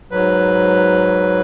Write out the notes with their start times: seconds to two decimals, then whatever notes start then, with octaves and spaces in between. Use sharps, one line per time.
0.11 G#2 F#3 B4